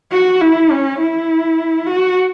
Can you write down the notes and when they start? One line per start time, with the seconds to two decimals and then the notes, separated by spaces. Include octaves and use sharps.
0.12 F#4
0.41 E4
0.71 C#4
1.00 E4
1.87 F#4